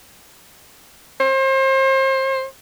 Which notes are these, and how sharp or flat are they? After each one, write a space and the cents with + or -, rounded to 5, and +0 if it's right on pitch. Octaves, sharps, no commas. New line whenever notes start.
C5 +35